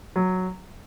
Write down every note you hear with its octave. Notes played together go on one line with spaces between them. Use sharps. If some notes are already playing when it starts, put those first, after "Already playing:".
F#3